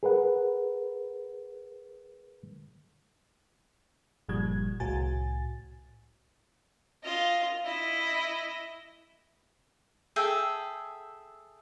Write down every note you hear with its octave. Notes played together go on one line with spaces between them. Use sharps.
G#4 A#4 B4 F#5
G1 A#2 F3 G3 G#6
C2 A2 F#4 G#5 A6
F4 D#5
E4 D#5
G#4 A4 E5 G5